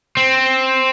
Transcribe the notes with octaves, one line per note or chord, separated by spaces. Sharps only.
C4